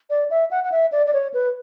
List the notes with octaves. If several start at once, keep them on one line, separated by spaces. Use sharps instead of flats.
D5
E5
F#5
F#5
E5
D5
D5
C#5
B4